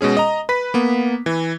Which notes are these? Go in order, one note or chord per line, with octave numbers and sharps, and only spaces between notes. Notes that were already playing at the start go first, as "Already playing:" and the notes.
B2 G#3 C#4 G#4
D#5 A#5
B4 B6
A#3 B3
E3